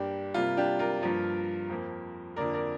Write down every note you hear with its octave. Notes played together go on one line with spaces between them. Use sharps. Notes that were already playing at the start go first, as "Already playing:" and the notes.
Already playing: G2 G3 A#3 D4 G4
C3 G3 A#3 F4
D4 G4
F4 A#4
G2 F3 A#3 F4 A#4
F2 F3 A#3
F2 D3 A#3 A#4 D5
A#4 D5